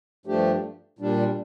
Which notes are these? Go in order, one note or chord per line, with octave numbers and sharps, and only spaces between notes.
G2 F3 A3 D4 G4
A#2 G3 D4